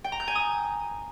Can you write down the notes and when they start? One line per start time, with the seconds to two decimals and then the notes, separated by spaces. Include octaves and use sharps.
0.04 G5
0.12 A#5
0.20 G6
0.28 G#5
0.35 D#6